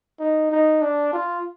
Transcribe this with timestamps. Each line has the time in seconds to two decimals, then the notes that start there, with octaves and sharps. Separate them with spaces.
0.19 D#4
0.51 D#4
0.82 D4
1.13 F4